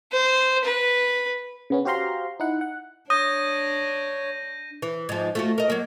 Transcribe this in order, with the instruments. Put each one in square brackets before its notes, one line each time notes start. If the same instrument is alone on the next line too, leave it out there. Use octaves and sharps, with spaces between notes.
[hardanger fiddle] C5
B4
[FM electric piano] C#3 B3 C#4
F#4 G4 C5 F5 A#5 C6
D#4 E4 F#5
F#5
[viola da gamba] D4 [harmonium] C#5 [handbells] D#6 [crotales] G6 A#6 D#7
[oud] E3
G#2 F3
A3 F4 F#4
A#4 D#5
F#3 A#3